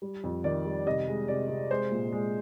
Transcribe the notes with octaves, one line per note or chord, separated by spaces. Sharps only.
G3
F2
D#3 D5
G3
C3 D#5
G#3
C3 D5
C3
G#3 C5
A#2
G#3